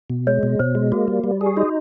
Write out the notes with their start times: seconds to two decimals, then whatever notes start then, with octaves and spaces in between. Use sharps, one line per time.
0.10 B2
0.27 G#3 C#5
0.43 B2
0.59 B2 C5
0.75 G#3
0.92 A#3 F#4
1.08 G3
1.24 G3
1.41 G4 G#4
1.57 D#4 F#4